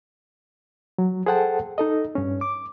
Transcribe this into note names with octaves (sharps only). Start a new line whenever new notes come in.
F#3
G#4 A4 C5 F#5 G5 A5
D#4 A4 D#5
G2 C#4
D6